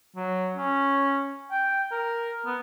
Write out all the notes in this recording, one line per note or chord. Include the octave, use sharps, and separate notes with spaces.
F#3
C#4
G5
A#4
B3